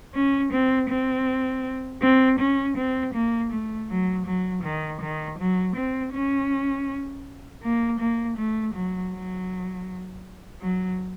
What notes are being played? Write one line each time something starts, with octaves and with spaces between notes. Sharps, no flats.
C#4
C4
C4
C4
C#4
C4
A#3
A3
F#3
F#3
D#3
D#3
F#3
C4
C#4
A#3
A#3
A3
F#3
F#3
F#3